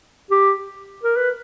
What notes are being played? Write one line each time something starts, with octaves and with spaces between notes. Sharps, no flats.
G4
A#4
B4